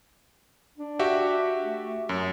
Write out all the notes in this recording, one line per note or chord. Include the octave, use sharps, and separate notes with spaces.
D4
F#4 G4 E5
A3
F#2 F#3